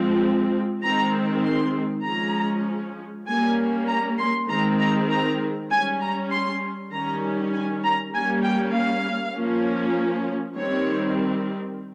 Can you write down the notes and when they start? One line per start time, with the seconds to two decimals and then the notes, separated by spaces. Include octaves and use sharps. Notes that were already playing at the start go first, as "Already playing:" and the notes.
Already playing: F3 G#3 C4
0.83 D#3 G#3 C4 A#5
1.44 C6
2.04 F3 G#3 C#4 A#5
3.26 G3 A#3 C#4 G#5
3.88 A#5
4.18 C6
4.49 D#3 G#3 C4 A#5
4.79 A#5
5.09 A#5
5.69 G3 C#4 G#5
6.01 A#5
6.31 C6
6.91 D#3 G3 C#4 A#5
7.53 G#5
7.83 A#5
8.13 G3 A#3 C#4 G#5
8.44 G5
8.74 F5
9.35 F3 A#3 C#4
10.57 D#3 G3 C4 C#5